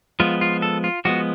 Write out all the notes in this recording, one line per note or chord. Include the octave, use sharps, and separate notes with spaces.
F3 G#3 B3 F4
F4
A4
F4
F3 G#3 B3 F#4